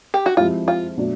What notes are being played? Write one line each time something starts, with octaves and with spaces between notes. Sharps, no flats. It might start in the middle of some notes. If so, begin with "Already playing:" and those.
G4
F#4
F3 G#3 C4 E4 F4 G4
F4
B2 F#3 A3 D4